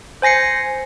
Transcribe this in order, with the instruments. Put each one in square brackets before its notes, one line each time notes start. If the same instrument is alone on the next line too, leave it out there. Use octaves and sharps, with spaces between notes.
[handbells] C5 G#5 A#6 C7 C#7